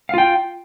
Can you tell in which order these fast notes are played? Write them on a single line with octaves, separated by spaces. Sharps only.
F5 F4 G5